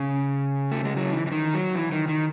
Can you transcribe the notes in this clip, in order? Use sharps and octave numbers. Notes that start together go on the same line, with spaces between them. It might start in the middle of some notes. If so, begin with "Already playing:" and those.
Already playing: C#3
A3
G#3
F#3
E3
E3
D#3
F#3
E3
D#3
D#3